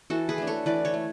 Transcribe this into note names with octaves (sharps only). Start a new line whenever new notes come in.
E3 F#4 A4
G#4 B4
A3 D4
A4 C#5
E3 B4 D5
A4 C#5
A3